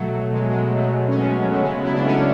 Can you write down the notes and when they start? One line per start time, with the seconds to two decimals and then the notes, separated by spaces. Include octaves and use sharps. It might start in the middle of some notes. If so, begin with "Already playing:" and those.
Already playing: B2 F#3 A3
0.11 F#3
0.32 B2 G#3
0.40 F#3
0.49 G#3
0.54 F#3
0.76 B2 F#3 A3
0.98 F#3
1.08 C#4
1.18 B2 G#3 B3
1.40 F#3
1.51 A3
1.61 C#3 G#3 B3
1.82 F#3 E4
1.93 D4
2.05 C#3 A3 C#4